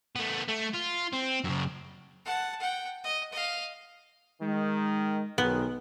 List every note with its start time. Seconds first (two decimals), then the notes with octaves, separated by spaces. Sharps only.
0.16 A3 B3
0.49 A3
0.74 F4
1.13 C4
1.44 F#2 C#3
2.25 F#5 A5
2.60 F#5 G5
3.04 D#5
3.33 D#5 F5
4.42 D#3 G#3
5.38 B1 D#3 G#3 B3